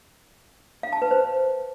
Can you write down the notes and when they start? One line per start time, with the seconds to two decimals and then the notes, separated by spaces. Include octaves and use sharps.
0.83 F5
0.93 A5
1.02 B4
1.11 C5